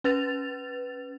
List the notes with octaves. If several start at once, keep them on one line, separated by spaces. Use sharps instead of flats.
C#4 B4 A6 F7